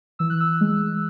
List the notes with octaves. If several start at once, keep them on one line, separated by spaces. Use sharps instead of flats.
E3 E6
F#6
E6
G#3